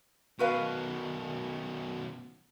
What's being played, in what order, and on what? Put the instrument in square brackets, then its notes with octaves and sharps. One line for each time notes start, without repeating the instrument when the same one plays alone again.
[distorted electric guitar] B2 D#3 [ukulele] F#4 B4 F5